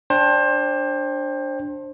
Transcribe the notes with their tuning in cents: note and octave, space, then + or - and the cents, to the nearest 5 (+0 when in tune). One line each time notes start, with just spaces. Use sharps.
D4 +0 C5 +25 G5 +25